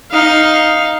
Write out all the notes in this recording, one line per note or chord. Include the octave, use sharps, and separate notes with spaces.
D#4 F5